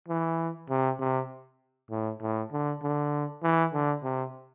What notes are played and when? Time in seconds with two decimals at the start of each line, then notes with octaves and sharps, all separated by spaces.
0.08 E3
0.70 C3
1.00 C3
1.91 A2
2.22 A2
2.53 D3
2.83 D3
3.43 E3
3.74 D3
4.04 C3